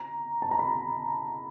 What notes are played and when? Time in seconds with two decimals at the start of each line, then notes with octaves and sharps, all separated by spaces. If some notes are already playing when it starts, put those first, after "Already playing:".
Already playing: A#5
0.42 A5
0.51 A#5
0.59 B5